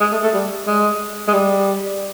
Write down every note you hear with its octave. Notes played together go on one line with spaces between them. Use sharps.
G#3
A3
A3
G3
G#3
G#3
G3